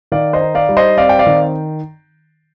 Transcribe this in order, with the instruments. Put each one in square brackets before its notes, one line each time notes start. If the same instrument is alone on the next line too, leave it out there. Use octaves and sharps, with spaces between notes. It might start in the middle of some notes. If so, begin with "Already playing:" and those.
[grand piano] D#3 D5 F5
C5 D#5
D#4
D5 F5
G3
C5 D#5
C4 D5 F5
G5
D5 F5
D#3